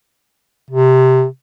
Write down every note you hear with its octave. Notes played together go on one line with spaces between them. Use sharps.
C3